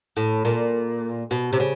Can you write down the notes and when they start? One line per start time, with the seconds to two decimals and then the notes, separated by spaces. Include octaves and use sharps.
0.17 A2
0.45 A#2
1.31 B2
1.53 C3
1.60 C#3